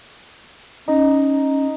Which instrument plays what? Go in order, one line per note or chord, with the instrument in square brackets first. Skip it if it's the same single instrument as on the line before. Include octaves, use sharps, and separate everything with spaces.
[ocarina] C#4 [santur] D#4